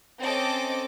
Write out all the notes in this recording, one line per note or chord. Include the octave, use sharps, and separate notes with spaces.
C4 C#4 A4 D#5 D6